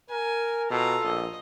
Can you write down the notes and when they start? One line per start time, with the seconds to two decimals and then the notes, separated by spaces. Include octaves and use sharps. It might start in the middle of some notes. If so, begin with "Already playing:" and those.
0.10 A#4 G#5
0.71 B2 F4 A4 A#5
1.04 A#1 D#5